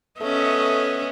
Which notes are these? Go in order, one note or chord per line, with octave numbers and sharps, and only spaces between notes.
A3 B3 C#4 D#5 E5